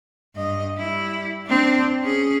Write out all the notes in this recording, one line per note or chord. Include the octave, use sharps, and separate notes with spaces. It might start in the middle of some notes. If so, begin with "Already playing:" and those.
G2 D#5
G3 E4
C4 D4
C#4 G#4